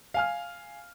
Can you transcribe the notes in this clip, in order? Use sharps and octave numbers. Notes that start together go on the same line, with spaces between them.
F5 G#5 F6